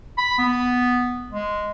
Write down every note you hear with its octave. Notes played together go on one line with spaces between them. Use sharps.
B5
B3
G#3